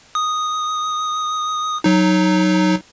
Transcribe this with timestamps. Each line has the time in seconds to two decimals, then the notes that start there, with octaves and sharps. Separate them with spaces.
0.15 D#6
1.84 F#3 D#4